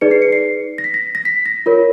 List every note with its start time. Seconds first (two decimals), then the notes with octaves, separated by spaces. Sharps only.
0.01 D#4 G#4 B4 D5 C#7
0.11 C7
0.22 C#7
0.32 C7
0.78 A#6
0.84 B6
0.94 A#6
1.15 A#6
1.25 B6
1.46 A#6
1.66 F4 A#4 C#5